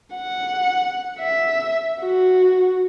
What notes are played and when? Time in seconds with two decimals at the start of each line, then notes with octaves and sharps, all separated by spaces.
0.15 F#5
1.19 E5
2.02 F#4